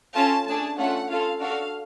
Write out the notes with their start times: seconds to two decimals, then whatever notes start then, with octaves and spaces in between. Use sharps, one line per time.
0.15 C#4 F4 A4 A5
0.47 A3 D4 G#4 A5
0.78 A3 C#4 F4 A4 F#5
1.09 C#4 F4 A4 F5
1.39 D4 F#4 A4 F5